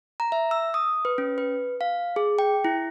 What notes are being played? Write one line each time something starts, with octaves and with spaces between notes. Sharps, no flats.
A#5
E5
E6
D#6
B4
C#4
B4
F5
G#4
G5
E4